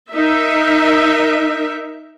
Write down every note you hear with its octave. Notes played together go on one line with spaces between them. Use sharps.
D#4 A#4 E5